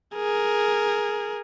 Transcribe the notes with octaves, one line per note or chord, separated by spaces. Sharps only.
G#4 A#4